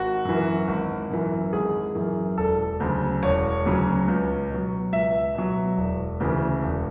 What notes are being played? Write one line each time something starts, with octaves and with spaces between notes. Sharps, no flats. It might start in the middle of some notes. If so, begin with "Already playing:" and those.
Already playing: G#1 F#4
F#2 E3
G#1
F#2 E3
G#1 G#4
F#2 E3
E1 A4
D2 C#3 F#3
E1 C#5
D2 C#3 F#3
C#2
B2 F#3
C#2 E5
B2 F#3
E1
D2 C#3 E3
E1